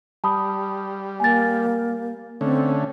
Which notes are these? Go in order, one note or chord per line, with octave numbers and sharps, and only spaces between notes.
G3 A5 B5 D#6
A#3 G#5 A6
D3 A3 C4 C#4